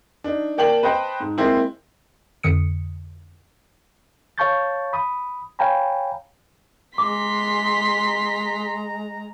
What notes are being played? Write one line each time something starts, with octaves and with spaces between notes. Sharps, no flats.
D4 D#4
A#3 D5 G5 A5 F#7
B4 C5 D#5 G5 A5
G#2
G#3 A#3 C4 E4
F2 D3 D#6 C#7
C#5 F5 A5 C#6 G6 A6
B5 D#6
C#5 F5 G5 G#5 A#5 B5
G#3 A#5 C6 D6 B6